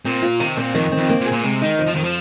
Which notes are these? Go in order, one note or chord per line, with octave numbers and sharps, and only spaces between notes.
A#2 C4
F4
C3 D#3
A#2 C4
F2 D#3
C4
F2
A#3
A#2
G#4
A#2
C3 G#3
D#3 D#4
F2
F3
F2 D#3
F3